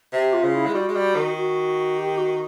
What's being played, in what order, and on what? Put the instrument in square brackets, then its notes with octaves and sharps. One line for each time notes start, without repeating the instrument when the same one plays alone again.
[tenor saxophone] C3 [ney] G4
[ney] F4
[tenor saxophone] C#3
[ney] E4
[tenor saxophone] G#3
[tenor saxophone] G3 [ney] F#4
[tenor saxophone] G#3
G3
D#3
[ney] F#4
G4
F#4